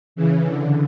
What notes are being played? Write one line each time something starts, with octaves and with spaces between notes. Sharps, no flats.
C#3 E3
D3